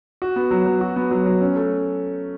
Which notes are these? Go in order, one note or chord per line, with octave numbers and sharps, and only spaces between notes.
F#4
B3
F#3
F#3
F#4
B3
F#3
F#3
C#4
A3